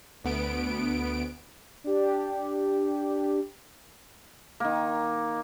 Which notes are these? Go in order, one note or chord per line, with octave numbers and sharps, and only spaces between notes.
D2 B3 D7
D4 G4
D#3 A#3